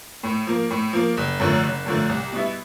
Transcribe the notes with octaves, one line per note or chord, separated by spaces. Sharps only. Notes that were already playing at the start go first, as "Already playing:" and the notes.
A2
F3 A#3
A2
F3 A#3
F#1
F#2 D3 F3 A3
F#1
F#2 D3 F3 A3
C2
B2 G3 B3 E4